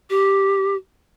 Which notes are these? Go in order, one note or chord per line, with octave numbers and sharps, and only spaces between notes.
G4